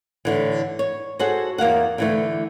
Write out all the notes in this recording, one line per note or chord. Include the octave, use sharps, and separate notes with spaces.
A2 D3 E3
C#5
F#4 G#4 A4 C5 C#5 F#5
E2 A#3 F5 F#5
D3 E3 A3